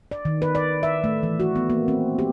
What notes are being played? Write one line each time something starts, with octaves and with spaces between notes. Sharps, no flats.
D5
D#3
B4
D5
E5
A3
E3
F#4
B3
A#3
C4
G4